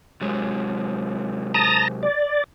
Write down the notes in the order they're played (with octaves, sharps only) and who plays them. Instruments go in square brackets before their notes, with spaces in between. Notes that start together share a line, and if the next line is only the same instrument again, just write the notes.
[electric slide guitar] C3 F#3 G#3
[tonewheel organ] A5 A#5 D#6
D5